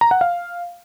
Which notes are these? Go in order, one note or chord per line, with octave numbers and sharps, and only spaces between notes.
A#5
F#5
F5